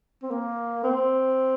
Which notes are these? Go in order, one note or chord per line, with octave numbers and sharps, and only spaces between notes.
C4
A#3
C4